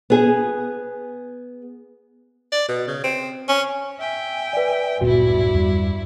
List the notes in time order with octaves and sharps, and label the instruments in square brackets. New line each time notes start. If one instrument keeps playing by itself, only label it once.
[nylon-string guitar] B3 G#4
[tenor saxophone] D5
B2
C#3
C4
C#4
[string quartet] E5 G5 G#5
[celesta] B4 D5
[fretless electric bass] D1 A#2 B3 [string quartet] G2 E4 [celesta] F#4
[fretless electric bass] E2 G3